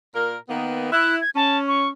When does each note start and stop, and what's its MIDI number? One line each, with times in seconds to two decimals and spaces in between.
0.15 0.36 46
0.15 0.36 58
0.15 0.36 70
0.49 0.89 51
0.49 0.89 58
0.49 0.89 59
0.92 1.19 64
0.92 1.16 90
1.21 1.30 92
1.36 1.92 61
1.36 1.58 81
1.68 1.88 85